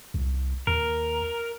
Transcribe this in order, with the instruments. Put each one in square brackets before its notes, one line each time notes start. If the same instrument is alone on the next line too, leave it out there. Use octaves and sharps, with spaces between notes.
[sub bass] C2
[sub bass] D#2 [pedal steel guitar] A#4